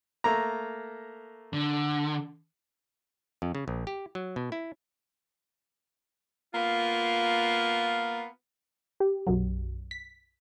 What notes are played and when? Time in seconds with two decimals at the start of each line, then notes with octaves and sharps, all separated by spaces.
0.24 A3 A#3 A#5
1.53 D3
3.42 F2
3.55 C#3
3.68 A#1
3.87 G4
4.15 F#3
4.36 B2
4.52 E4
6.53 A#3 B3 F4
9.00 G4
9.27 B1 F#2 F#3
9.91 B6